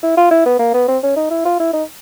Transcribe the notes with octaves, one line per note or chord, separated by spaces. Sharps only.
E4
F4
E4
B3
A#3
B3
C4
C#4
D#4
E4
F4
E4
D#4